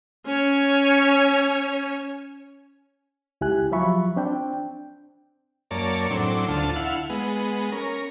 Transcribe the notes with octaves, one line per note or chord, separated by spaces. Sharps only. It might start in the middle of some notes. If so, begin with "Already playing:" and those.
C#4 C#5
C#2 E4 G4 G#5 F#6
F3 F#3 F4 E5 B5 C#6
C4 D4 G5
F#2 A#3 C#5 D5 A5
A2 F#3 C4 D4
D2 D3 F4 A5
E4 F5 F#5
G#3 B3
C#4 A#4